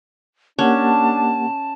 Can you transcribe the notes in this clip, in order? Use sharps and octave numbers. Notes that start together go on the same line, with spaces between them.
A#3 C#4 D4 G4 F#5 A5